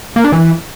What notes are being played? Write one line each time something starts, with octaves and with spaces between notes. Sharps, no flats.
A#3
D4
E3